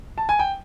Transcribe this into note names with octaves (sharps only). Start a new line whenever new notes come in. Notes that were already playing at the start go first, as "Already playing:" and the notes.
A5
G#5
G5